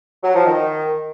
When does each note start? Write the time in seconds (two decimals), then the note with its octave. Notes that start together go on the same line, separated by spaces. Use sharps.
0.23 F#3
0.35 F3
0.46 D#3